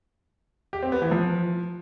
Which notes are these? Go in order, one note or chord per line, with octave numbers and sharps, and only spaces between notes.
G4
C4
B3
E3
F3